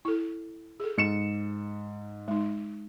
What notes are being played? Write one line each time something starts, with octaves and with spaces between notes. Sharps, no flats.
E4 A4
G#4 A4
G#2 C#7 E7
G#3 D#4